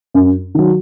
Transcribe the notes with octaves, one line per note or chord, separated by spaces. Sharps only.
F#2
D#3 F#3